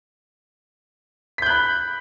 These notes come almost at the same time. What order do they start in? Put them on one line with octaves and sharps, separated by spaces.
B6 G6 F#6 B5